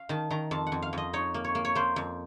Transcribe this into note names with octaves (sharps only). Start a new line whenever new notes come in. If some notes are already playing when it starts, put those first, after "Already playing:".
Already playing: F5
D#3 A5
D#3 A#5
F2 A5
F#5
F2
F5
F2 D#5
D#4 C#5
A#3
C#5
A#3
C#5
A#3 C5
F2